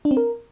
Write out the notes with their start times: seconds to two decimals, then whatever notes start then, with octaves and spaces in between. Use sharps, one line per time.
0.05 D4
0.11 C4
0.17 A#4